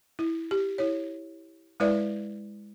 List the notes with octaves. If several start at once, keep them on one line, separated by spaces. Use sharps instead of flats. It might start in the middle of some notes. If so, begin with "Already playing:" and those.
E4
G4
E4 C#5
G#3 E4 B4 D5 E5